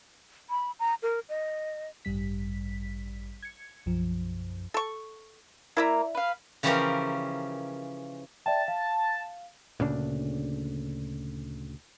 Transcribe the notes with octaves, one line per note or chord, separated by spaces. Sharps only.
B5
A#5
A#4
D#5
A1 G2 G3 B6
G#6 C#7
B1 F#2 F3
A4 C#6
A#3 E4 D5 E5 A#5
B4 F5
C#3 E3 F3 C#4 G4 A#4
D5 E5 G5 A5
F5
D2 A#2 C#3 D4